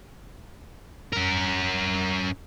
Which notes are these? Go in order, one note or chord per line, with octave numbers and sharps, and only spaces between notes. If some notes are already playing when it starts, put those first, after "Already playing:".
C#4 A#4